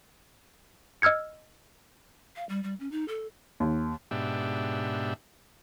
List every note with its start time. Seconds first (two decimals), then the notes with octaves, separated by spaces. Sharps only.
1.02 D#5 E6 F6 G#6 C#7
2.36 F5
2.49 G3
2.63 G3
2.80 C#4
2.92 D#4
3.08 A4
3.60 D#2
4.11 G#2 B2 D4 G4 E5